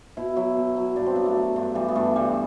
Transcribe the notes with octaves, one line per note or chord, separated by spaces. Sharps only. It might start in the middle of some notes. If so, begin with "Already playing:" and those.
B2 E4
F#3 E4
B2
F#3
G2 D4
C4
F#3 B3
A3
F#3
G2
E3 G3
B3
G2 A3
E3 G3